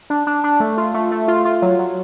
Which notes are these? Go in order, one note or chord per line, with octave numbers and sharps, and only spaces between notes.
D4
D4
D4
A3
F4
A3
A3
F4
F4
F#3
F#3